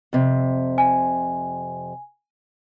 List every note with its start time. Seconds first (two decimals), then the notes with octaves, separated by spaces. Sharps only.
0.13 F2 C3
0.78 G#5